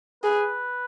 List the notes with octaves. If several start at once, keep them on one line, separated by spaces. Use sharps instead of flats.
G#4 B4